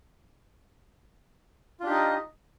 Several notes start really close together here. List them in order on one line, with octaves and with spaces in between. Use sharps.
F4 D4 G4 D#4 D#5